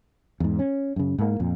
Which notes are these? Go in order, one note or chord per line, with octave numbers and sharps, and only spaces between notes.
E2 G#2
C#4
F#2 C#3
G#2 A#3
F2 A#2